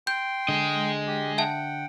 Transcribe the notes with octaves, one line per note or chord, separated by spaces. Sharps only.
G5 C6 G6
D3 G#4 D#5
G4
E5 F#5 G5 A5